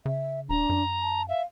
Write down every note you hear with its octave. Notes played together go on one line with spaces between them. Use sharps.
C#3 E5
D#1 D4 A#5
F#2
A5
E5 F5